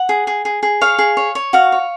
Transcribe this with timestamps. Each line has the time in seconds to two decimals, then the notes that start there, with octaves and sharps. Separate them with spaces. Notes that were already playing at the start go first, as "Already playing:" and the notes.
Already playing: F#5
0.09 G#4
0.27 G#4
0.45 G#4
0.63 G#4
0.81 C#5 F5
0.98 G#4
1.17 C#5
1.35 C#5
1.53 F#4 F5
1.72 C#5